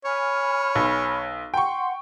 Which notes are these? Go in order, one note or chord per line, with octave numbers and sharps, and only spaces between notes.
C#5 G#5 B5 F6
B1
F#5 G5 C6 C#6